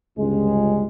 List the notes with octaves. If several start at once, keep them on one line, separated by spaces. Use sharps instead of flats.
G1 C#2 G3 G#3